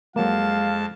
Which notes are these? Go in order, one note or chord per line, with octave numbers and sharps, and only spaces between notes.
F2 F#3 G#3 A#3 F5 A5